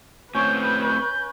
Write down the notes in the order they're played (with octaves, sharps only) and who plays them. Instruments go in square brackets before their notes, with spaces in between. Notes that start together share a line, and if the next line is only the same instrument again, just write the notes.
[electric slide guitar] A2 C4 [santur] C#4 C#5 [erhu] B4 [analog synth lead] G6